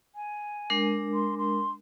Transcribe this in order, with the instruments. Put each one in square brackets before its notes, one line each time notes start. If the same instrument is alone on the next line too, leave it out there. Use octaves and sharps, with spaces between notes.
[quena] G#5
[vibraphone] G#3 D4 A#4
[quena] C6
C6